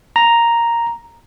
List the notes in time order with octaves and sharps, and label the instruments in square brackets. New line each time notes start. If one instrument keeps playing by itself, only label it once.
[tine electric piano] A#5